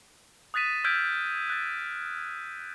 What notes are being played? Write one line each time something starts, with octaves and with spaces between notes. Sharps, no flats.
D#6 F#6 A6 B6 D#7 E7
E6 F6 G6 G#6 B6 D7
F#6 A6